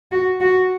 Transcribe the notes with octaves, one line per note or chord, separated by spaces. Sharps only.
F#4
F#4